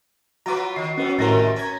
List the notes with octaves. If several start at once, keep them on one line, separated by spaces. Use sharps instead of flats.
F#3 F4 F#4 B4 A#5 D6
D#3 C7
F#3 B3 C#4 B4
G#1 F#2 A2 C3 D#3 A#4 A6 A#6
C#4 A#5 G#6